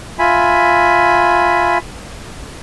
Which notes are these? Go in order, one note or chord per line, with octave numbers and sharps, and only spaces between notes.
F4 E5 G#5 B5